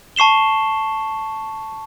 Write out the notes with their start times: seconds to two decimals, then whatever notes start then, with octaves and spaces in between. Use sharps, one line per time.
0.16 A5 C#6 C7 E7 G7